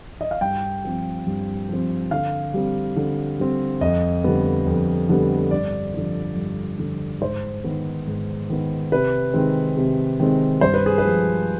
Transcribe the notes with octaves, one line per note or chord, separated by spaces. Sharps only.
D#5
F5
G2 G5
F3 C4
G2
F3 C4
D3 F5
G3 C4
D3
G3 C4
F2 D#5
D3 G3 B3
F2
D3 G3 B3
G2 D5
D3 F3
G2
D3 F3
G#2 C5
D#3 B3
G#2
D#3 B3
C3 B4
D#3 G#3 C4
C3
D#3 G#3 C4
G2 C5
B4
G#4
B4
F3 G#3